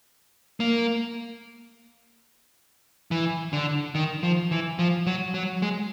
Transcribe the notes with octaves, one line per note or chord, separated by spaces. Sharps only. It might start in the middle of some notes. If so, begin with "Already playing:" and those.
A#3
E3
D3
D#3
F3
E3
F3
F#3
F#3
G#3